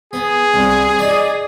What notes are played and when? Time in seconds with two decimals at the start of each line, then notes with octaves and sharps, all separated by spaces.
0.13 B3 G#4
0.54 C2
0.99 D#4 D5